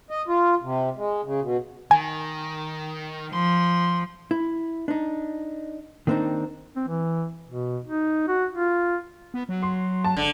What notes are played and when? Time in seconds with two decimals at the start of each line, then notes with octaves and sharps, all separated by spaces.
0.10 D#5
0.28 F4
0.62 C3
0.97 G#3
1.25 C#3
1.42 B2
1.91 D#3 G#5
3.33 F3 C6
4.31 E4
4.88 D4 D#4
6.07 D#3 A#3 C4 D4 D#4
6.76 C4
6.88 E3
7.47 B2
7.84 D#4
8.28 F#4
8.51 F4
9.34 B3
9.49 F#3
9.63 C6
10.05 A5
10.17 G#1 D3